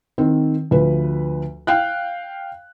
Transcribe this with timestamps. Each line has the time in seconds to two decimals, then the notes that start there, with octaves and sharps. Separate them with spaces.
0.18 D#3 C4
0.71 D2 F3 B4
1.67 F5 G5 F#6